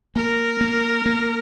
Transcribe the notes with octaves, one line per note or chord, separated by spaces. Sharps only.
A#3 A#4
A#3
A#3